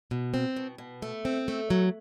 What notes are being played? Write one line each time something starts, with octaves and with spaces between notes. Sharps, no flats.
B2
C4
B2
B2
A3
C4
A3
F#3